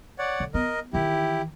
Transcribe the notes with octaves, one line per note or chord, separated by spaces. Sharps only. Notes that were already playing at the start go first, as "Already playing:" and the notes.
C#5 D5 F#5
D3
B3 A#4 D#5
D#3 E3 E4 G4